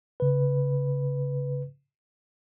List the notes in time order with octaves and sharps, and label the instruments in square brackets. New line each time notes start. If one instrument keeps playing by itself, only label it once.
[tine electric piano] C#3 B4